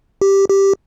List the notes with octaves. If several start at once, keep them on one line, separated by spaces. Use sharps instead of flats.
G4
G4